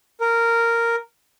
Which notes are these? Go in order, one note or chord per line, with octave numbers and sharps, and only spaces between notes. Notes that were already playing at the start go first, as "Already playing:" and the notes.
A#4